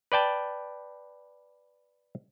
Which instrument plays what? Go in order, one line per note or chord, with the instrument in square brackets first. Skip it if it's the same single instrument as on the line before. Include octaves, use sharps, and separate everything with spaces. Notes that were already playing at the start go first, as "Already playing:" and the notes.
[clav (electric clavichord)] B4 D5 G5 A5